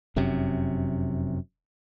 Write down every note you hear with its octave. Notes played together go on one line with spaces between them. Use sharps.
F1 F#2 C3